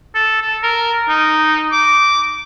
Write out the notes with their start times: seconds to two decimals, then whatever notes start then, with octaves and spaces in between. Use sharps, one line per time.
0.15 A4
0.41 A4
0.63 A#4
1.09 D#4
1.72 D6